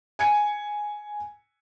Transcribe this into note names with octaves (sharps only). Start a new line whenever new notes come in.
G#5 G#6 C#7